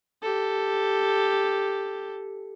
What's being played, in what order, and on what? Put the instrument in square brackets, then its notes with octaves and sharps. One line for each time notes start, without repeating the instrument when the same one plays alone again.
[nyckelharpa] G4 A4